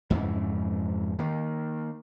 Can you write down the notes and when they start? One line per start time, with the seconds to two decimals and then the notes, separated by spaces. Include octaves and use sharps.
0.10 F2 G#2 C#3 E3
1.19 D#3 A#3